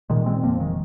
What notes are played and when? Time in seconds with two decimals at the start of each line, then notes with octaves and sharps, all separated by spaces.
0.10 A#2 D#3 G#3
0.26 G#3 C4
0.43 F1 F3 A#3
0.60 D#3 G#3